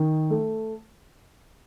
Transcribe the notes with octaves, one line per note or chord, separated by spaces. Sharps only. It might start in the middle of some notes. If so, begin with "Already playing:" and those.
Already playing: D#3
A3